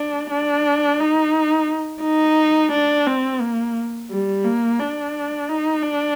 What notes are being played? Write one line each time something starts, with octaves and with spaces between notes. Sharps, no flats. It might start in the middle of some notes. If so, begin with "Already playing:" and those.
Already playing: D4
D4
D#4
D#4
D4
C4
A#3
G3
A#3
D4
D#4
D4